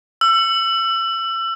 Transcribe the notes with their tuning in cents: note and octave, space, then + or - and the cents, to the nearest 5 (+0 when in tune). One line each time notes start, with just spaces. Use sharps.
E6 +30